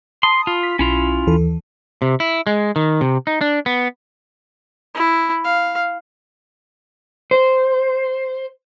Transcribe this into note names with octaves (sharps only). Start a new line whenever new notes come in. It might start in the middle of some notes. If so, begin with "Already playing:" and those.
A5 B5 C6 D#6
F4
B6
B1 C#4 E4 F4
D#2 E3 A4
C3
E4
G#3
D#3
C3
D#4
D4
B3
E4
F5
C5